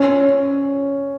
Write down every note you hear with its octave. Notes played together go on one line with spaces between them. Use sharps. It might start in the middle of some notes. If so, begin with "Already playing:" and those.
Already playing: C#4